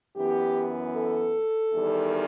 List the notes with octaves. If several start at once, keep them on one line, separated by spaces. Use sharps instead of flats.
F#2 E3 B3 G4
A4
E2 D#3 G3